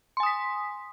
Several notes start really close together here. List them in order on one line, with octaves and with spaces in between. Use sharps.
C6 G#5 D#6 B6